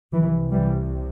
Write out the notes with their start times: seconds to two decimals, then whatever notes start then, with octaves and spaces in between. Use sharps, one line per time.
0.14 C2 C3 E3
0.52 E3 G3